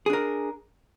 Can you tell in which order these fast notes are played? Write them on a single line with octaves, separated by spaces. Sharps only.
G#4 D4 A#4